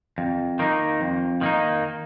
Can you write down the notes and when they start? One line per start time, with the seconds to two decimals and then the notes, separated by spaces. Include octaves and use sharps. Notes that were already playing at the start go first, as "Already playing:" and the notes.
0.18 F2
0.59 D#3 A#3 D#4
1.01 F2
1.41 D#3 A#3 D#4